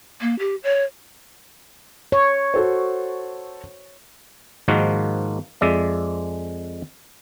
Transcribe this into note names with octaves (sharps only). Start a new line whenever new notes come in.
A#3
G4
C#5
C#5
F#4 A4 C5
G#2 D#3 F3 A#3 F4 F#4
F2 G#3 D5 E5